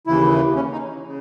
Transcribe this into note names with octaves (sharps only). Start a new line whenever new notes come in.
D#2 C#3 E3 E4
C#4
D#4
C#3